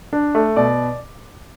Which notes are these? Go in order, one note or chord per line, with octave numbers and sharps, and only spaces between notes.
D4
A3
B2 D5